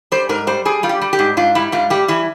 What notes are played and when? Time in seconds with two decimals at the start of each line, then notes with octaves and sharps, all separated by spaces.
0.12 G3 C5
0.29 G#2 A#4
0.47 G3 C5
0.65 G3 G#4
0.83 G3 F4
0.89 G4
1.01 G3
1.13 G4
1.19 G#2
1.37 G#2 F4
1.55 G3 E4
1.72 G#2 F4
1.90 G3 G4
2.08 E3 E4